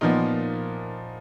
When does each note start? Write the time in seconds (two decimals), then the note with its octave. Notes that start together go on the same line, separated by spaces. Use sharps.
0.01 A#2 F3 B3 D#4